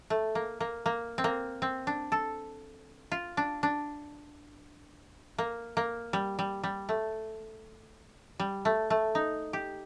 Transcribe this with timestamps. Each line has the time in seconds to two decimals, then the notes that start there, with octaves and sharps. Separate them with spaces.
0.10 A3
0.35 A#3
0.60 A#3
0.86 A#3
1.18 C4
1.24 A#3
1.62 C4
1.87 D4
2.12 A4
3.12 F4
3.37 D4
3.63 D4
5.38 A#3
5.77 A#3
6.13 G3
6.39 G3
6.64 G3
6.89 A3
8.40 G3
8.65 A3
8.90 A3
9.15 D#4
9.53 G4